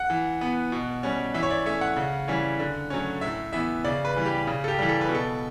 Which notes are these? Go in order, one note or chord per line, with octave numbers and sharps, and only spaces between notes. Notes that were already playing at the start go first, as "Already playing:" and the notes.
Already playing: F#5
E3
B3
B2
G3 C#4
E3 E5
C#5
D5
A3 C#4 E5
F#5
C#3
E3 G3 C#4
D3
F#3 A3 C#4
A2 E5
E3 B3 E5
C#3 D5
B4
E3 G3
G4
C#3
A4
G4
E3 G3
A4
B4
B2
A4